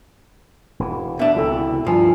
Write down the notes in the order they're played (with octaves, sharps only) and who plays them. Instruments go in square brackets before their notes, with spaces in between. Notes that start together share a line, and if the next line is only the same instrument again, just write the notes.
[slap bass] E1 E3
[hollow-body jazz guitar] B2 D4 [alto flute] E5
[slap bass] C#2 C3 E3 [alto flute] A4
[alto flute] E4
[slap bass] G2 D#3 [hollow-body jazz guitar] F3 [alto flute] G#5